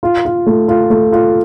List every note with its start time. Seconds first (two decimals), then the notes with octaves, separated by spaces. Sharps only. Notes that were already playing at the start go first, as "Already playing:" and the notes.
0.03 F4
0.25 F4
0.46 A3
0.68 F4
0.90 A3
1.12 F4